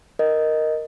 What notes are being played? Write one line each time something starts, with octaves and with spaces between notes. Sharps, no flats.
A#4 D#5